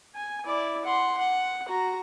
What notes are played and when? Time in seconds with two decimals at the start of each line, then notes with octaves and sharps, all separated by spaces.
0.15 G#5
0.46 E4 D5
0.85 F#5 C6
1.17 F#5
1.68 F#4 A#5